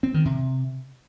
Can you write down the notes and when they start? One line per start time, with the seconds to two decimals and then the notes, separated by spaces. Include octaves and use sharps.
0.03 C4
0.14 D#3
0.25 C3